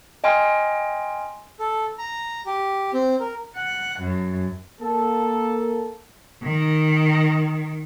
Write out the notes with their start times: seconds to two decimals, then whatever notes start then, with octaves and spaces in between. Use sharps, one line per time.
0.24 D#5 G5 G#5 C6 F6
1.59 A4
1.98 A#5
2.46 G4
2.93 C4
3.20 A#4
3.55 F#5
4.01 F#2
4.81 A#3 A4
6.43 D#3